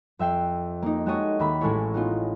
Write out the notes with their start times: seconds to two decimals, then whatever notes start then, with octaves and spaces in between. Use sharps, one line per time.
0.19 F2 E5 G5 C7 E7
0.82 A#3 D#4
1.06 G#3 F#4 G4 A4 C#5 D#5
1.39 D#2 A#3 E5 B5
1.61 A1 G#3 E4 A4 C#5
1.94 B3 D#4 F4